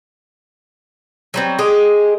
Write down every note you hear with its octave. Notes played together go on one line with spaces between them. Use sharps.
F#3 G3 C4
G#3 G4 G#4 D#5